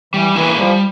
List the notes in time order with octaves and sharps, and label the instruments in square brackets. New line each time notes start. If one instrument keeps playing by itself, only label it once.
[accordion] E3 [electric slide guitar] G3
[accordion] E3 [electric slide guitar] A#3 E4 G#4
[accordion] F3 [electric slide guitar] G3